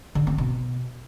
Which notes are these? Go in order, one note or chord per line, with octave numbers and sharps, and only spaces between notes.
D3
C4
B2